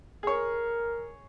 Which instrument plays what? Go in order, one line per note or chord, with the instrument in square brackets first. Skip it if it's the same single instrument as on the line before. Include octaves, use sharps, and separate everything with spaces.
[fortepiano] G#4 C#5 [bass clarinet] A#4